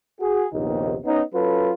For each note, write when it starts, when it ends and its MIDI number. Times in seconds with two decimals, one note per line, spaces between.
0.20 0.46 66
0.20 0.46 68
0.53 0.97 34
0.53 0.97 39
0.53 0.97 48
0.53 0.97 59
0.53 0.97 63
1.05 1.22 59
1.05 1.22 61
1.05 1.22 63
1.33 1.72 54
1.33 1.72 61
1.33 1.72 65
1.33 1.72 69
1.33 1.72 71